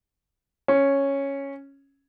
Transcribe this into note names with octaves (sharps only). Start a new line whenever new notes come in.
C#4